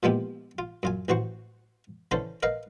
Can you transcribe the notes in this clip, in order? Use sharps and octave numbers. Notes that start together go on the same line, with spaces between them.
A#2 F3 G#3 B3 E4 G4
F4
F#2 F4 G#5
A1 E3 F#4 C5 C#6
D3 E3 C#4 A4 C5
A#4 B4 D#5 F5